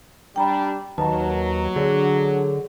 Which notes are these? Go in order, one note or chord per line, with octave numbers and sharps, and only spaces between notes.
G3 D4 G5 A#5 B5
D#2 F#3 B4 D#5 A5 A#5
D3 G#4 C#5 D5